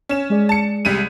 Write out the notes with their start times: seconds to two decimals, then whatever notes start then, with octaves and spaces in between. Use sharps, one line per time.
0.09 C#4 E7
0.30 G#3 G#4 D5
0.49 A5 C#7
0.85 C2 G3 D#7